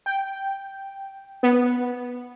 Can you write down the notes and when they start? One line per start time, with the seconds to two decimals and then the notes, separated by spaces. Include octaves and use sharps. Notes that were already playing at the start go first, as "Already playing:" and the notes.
0.06 G5
1.43 B3